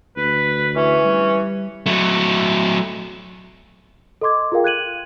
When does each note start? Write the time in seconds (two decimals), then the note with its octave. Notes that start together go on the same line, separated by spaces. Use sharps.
0.17 D2 B4
0.76 E3 C#4
1.05 G3
1.86 F#3 A3
4.21 A4 D#5 C6 D6 G#6
4.52 F4 G#4 A#4 F5 G5
4.64 F#6 G#6 D#7 F#7